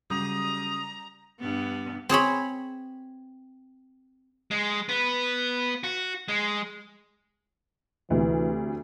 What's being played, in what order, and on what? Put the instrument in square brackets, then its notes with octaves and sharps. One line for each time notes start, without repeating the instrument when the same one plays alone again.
[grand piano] C#3 F#3 [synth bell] G3 [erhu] A#5 [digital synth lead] D#6
[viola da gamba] G2 B3
[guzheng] C4 G#4 C#5 B5
[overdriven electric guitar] G#3
B3
F#4
G#3
[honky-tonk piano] D2 C3 [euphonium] E3